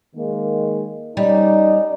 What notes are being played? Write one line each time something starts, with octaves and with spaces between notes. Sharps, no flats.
D#3 G#3 A#3
G3 C#4 D#4 D5